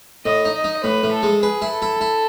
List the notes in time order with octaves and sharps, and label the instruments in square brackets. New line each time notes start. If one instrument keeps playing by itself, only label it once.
[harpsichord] A2 [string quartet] D#5
[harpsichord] D#4
[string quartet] D#5
[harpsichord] D#4
[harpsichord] A2 [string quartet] B4
[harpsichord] A2
[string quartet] A4
[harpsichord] G#3
[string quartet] G#4 [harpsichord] B4
[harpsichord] E4
[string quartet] A4
[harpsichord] E4
E4